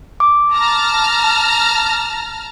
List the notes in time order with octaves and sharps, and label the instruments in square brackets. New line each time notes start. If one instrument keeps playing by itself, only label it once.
[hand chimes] D6
[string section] A5 A#5 F6